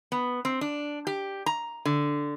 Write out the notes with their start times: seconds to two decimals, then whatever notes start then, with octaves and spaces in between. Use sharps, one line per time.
0.12 B3
0.45 C4
0.61 D4
1.07 G4
1.46 A#5
1.85 D3